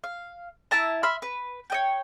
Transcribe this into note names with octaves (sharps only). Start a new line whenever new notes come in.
F5
E4 E5 A5 A#5
E5 B5 C6 F6
B4
C#5 D#5 G5